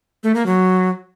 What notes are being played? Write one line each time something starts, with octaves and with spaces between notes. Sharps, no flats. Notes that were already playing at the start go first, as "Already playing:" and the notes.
A3
A#3
F#3